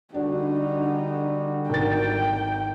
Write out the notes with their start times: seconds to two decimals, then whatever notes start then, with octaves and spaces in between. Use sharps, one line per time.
0.14 D3 G3 D4 D#4 F#4
1.70 G#1 A#4 G5 A6